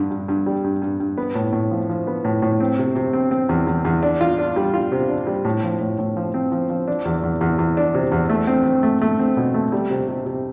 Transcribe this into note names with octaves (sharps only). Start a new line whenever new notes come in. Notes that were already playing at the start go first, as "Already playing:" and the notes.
Already playing: G2 D3
G2
G2
G3
G2
G2
G2
B3
A2
A2
F3
F3
B3
A2
A2
C4
C3
C3
C4
C4
E2
E2
E2
D4
F4
D4
G3
F4
C3
D4
G3
A2
F3
A2
A2
F3
C4
F3
F3
D4
E2
E2
E2
E2
D4
C3
E2
A3
C4
C4
A3
A3
C4
B2
A3
G3
C3
C3
C3